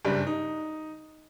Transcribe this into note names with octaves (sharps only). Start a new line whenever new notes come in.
F#1 G2 G3
D#4